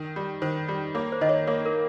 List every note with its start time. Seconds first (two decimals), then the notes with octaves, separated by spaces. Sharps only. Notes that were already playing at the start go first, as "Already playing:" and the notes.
Already playing: D#3
0.16 G3
0.42 D#3 C5
0.68 G3
0.95 A#3 C#5
1.12 C5
1.21 D#3 D#5
1.29 C#5
1.47 A#3 C#5
1.66 A#4